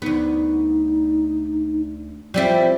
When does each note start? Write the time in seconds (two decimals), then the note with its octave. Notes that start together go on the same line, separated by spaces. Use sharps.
0.02 D2 B3 D#4
2.34 G3 C4 E4 F4